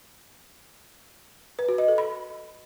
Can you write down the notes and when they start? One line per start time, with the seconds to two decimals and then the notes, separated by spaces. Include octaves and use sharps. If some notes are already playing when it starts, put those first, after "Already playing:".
1.59 B4
1.69 F#4
1.78 D#5
1.88 A4
1.98 B5